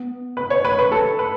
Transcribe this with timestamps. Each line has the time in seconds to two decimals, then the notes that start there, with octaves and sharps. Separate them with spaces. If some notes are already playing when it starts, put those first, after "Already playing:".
Already playing: B3
0.37 B4
0.50 C#5
0.65 B4
0.79 B4
0.92 A4
1.19 B4